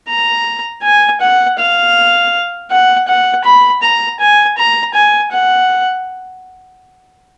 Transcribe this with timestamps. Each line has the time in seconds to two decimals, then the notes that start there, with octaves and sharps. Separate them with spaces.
0.09 A#5
0.83 G#5
1.21 F#5
1.59 F5
2.71 F#5
3.08 F#5
3.45 B5
3.82 A#5
4.20 G#5
4.58 A#5
4.94 G#5
5.32 F#5